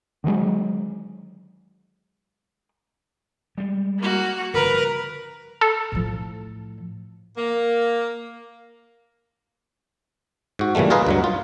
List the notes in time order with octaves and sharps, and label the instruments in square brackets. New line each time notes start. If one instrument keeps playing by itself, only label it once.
[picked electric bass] D3 D#3 F#3 G#3
[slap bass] G3 G#3
[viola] A#3 F#4
[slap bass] G1 C#3 F3 [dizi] A#4 [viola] B4
[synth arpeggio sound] A4
[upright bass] A2 F3
[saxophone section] A#3
[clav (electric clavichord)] G#2 F#4
A#2 C#3 E3 G3 A3
F4 G#4 A#4 B4 D#5 F5
D2 G2 F#3
F4